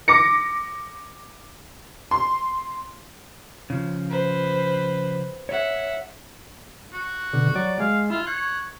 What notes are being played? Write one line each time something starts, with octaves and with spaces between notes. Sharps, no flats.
D6 A#6 C#7
C6
C#3 F3
B4 C5
C#5 E5 F#5
F#4
B2 D3
F#3 D5
G#3 F5
E4 F4
C#5 F#6